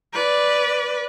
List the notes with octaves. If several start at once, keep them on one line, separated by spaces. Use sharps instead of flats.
B4 D5